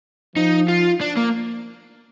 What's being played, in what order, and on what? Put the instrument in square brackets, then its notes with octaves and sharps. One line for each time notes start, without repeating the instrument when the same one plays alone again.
[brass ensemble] F3 [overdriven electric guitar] D#4
[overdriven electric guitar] F4
D4
A#3